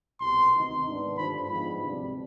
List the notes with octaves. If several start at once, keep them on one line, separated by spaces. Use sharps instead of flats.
C2 B2 B3 C6
D2 C3 D#3 B3 D#4
G#2 D#3 B3 D4
G2 D3 F3 B5
G#2 F3 G#3 B3 B5
D2 C3 G3 D4